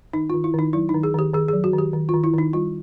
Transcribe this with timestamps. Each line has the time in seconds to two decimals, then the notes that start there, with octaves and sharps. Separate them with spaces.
0.13 D#3 D#4
0.30 F4
0.34 D#3
0.44 E4
0.54 D#3 D#4
0.73 F#3 E4
0.89 D#4
0.94 D#3
1.03 G#4
1.14 D#3 G4
1.33 D#3 G#4
1.48 G#4
1.53 F#3
1.64 F#4
1.73 D#3
1.78 G4
1.93 D#3
2.09 F4
2.14 D#3
2.24 E4
2.34 D#3 D#4
2.53 G3 F4